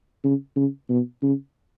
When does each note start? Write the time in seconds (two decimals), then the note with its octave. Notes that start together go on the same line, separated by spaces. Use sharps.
0.24 C#3
0.56 C#3
0.90 B2
1.23 C#3